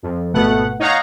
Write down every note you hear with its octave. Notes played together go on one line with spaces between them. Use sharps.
F2
G#1 B2 A3 B3 F#5
D#4 C#5 F5 F#5 A#5